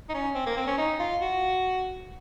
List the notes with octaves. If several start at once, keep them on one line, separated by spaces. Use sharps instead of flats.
D#4
C#4
C4
A#3
C4
C#4
D#4
F4
F#4